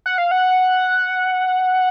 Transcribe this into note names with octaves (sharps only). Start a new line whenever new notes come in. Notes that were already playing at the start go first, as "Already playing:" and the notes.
F#5
F5
F#5